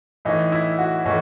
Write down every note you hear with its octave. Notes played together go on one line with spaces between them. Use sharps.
A2 E3 D#4
E4
F#4
A2 E3 D#4